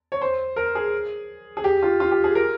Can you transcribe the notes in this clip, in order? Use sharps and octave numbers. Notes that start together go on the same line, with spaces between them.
C#5
C5
A#4
G#4
G#4
G4
F4
F4
G4
G#4
A#4